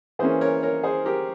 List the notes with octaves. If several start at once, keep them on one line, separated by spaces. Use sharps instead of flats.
E3 A#3 C#4 G#4 C5
A#4 C#5
A#4 C#5
G#4 C5
G4 A#4